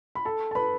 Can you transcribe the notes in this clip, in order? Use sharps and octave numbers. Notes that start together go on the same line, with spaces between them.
B5
A4 A5
A5
B4 B5